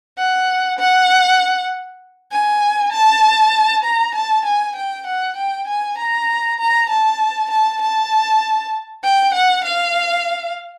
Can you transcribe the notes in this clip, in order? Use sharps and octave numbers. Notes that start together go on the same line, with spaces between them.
F#5
F#5
G#5
A5
A#5
A5
G#5
G5
F#5
G5
G#5
A#5
A#5
A5
A5
A5
G5
F#5
F5